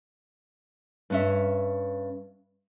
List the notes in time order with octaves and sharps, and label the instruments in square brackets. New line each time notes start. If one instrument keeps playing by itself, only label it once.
[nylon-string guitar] G2 C#4 E5